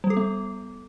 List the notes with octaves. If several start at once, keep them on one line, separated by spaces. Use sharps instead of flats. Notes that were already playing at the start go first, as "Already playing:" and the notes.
G3
A4
B3